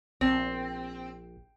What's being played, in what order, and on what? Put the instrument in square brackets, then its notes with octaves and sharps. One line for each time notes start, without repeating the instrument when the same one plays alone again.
[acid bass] A#1 [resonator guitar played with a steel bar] C4